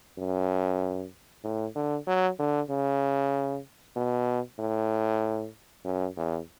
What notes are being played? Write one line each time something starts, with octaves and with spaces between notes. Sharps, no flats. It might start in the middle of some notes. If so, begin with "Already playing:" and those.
F#2
A2
D3
F#3
D3
C#3
B2
A2
F#2
E2